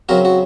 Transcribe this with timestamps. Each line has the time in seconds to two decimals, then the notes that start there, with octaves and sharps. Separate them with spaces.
0.09 C#3 F#3 C4 F#4 A#4
0.25 F#4